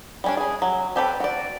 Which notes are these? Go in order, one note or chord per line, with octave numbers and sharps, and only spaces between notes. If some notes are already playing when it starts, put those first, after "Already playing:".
G3 C#4 D4
C#4 G#4
F#3
C4 G4 A4 B4
F#4 D5